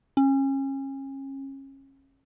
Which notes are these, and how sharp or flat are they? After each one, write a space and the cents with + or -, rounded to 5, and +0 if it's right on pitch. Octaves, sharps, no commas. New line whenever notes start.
C#4 -30